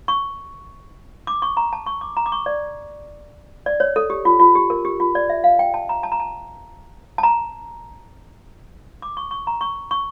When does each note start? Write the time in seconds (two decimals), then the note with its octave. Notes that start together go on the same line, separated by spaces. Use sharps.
0.08 C#6
1.27 D6
1.42 C#6
1.57 A#5
1.73 A5
1.86 C#6
2.01 D6
2.17 A#5
2.26 D6
2.32 C#6
2.46 D5
3.66 D5
3.80 C#5
3.96 A4
4.10 G4
4.25 F4
4.40 F4
4.55 G4
4.70 A#4
4.85 G4
5.00 F4
5.15 D5
5.29 E5
5.44 F5
5.59 G5
5.74 A5
5.89 A#5
6.03 A5
6.12 A#5
6.20 A5
7.18 A5
7.23 A#5
9.02 D6
9.17 C#6
9.31 C#6
9.47 A#5
9.61 C#6
9.91 C#6